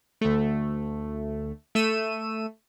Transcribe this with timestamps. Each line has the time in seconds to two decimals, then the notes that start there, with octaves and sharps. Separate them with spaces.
0.21 D2 A3
1.75 A3 E6 D#7